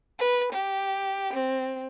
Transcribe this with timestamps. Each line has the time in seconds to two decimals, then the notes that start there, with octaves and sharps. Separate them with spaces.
0.19 B4
0.53 G4
1.33 C4